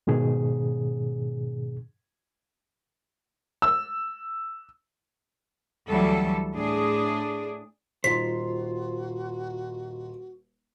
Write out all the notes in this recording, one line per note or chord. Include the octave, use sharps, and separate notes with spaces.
G#2 B2 D#3 G#4
E6
D2 E3 F#3 G3 A4
A2 D4 G#4
D#1 D#4 F4 F#4 C5 C6 B6